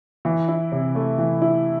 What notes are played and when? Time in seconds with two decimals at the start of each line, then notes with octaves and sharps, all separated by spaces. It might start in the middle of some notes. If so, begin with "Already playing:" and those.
0.25 E3
0.48 E4
0.72 C3
0.95 A3
1.18 E3
1.42 E4